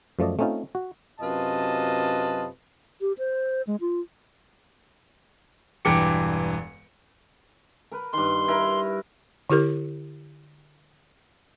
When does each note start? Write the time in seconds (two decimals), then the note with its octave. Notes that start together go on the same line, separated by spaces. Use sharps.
0.19 F#2 F3 A3 D5 D#5
0.39 A3 C4 C#4 D#4 F4
0.75 F#4
1.20 F#2 C3 F4 B4 D#5 A5
3.01 G4
3.18 C5
3.67 G#3
3.81 F4
5.85 E1 G2 E3 G5 D6 C#7
7.92 A#4 B4
8.13 G2 D#3 C6
8.48 E4 A#4 B4
9.50 D3 E4 G4 A#4